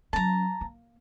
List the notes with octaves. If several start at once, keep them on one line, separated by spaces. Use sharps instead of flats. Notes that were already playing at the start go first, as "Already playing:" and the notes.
F#3 C#4 A5 A#5
A#3